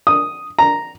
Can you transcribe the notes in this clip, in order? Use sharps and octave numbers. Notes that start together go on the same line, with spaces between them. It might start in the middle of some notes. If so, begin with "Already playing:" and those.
D#6
A#5